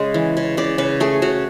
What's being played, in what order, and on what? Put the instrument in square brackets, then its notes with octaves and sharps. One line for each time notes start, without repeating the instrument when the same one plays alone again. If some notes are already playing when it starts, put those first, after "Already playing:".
Already playing: [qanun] C#3 G#3
E3
C#3
C#3 D5
C#3 B4
A3 G#4
C#3 F#4